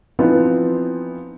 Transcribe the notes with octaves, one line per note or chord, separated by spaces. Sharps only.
E3 F3 B3 C4 D#4 F4